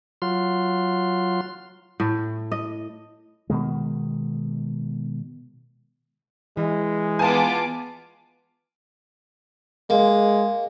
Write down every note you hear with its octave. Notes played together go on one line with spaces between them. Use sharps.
F#3 F4 C6
A2
D#5
B2 D#3 G#3
E3 G#3
B3 F4 G#5 A5 D6
G#3 A#3